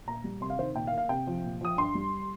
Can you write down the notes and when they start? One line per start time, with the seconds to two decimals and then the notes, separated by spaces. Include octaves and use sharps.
0.07 A#2 A#5
0.24 G3
0.41 C3 C6
0.50 F5
0.58 D#3 C5
0.75 A#2 G5
0.87 F5
0.92 A#3
0.98 F5
1.09 C3 G5
1.27 F3
1.44 A#2
1.61 F3 D#6
1.77 G2 C6
1.95 G3